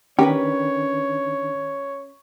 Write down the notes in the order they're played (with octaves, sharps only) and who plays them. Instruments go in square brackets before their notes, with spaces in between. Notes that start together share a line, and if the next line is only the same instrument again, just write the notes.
[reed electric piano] D#3 D4 [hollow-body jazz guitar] C#4 A#4 B4 [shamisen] G4 [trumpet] C#5